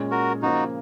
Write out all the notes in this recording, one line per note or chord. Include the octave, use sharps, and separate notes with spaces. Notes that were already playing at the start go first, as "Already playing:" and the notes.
Already playing: A#2 G#3 C#4
F#4 A#4
C#3 F3 A#3 D#4 F#4